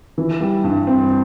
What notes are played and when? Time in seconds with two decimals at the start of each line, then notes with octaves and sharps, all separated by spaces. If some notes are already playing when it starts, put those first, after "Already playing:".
0.18 E3
0.40 G3
0.64 G2
0.87 C4